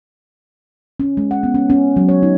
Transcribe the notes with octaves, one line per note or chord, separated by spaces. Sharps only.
C#4
G#3
F#5
B3
C#4
C#4
F#3
C#5
D#4